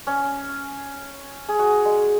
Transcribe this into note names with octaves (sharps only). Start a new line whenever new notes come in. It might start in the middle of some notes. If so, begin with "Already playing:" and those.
C#4
G#4
F#4
G#3